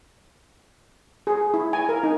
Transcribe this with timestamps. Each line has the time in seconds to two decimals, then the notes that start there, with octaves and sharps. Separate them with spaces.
1.27 G#4
1.54 E4
1.73 G#5
1.89 A#4
2.03 D#4